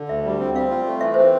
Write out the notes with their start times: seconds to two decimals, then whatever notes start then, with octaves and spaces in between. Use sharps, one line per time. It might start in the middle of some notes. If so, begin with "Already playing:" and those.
Already playing: D3
0.09 D2 E5
0.25 G3
0.39 C4
0.55 C4 F5
0.70 F4
0.86 A3
1.01 E3 E5
1.14 C4 C5